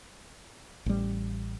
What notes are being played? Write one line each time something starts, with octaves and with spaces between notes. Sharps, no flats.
A1 G3